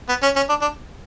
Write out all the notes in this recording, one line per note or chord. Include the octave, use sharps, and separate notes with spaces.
B3
C#4
C#4
D4
D4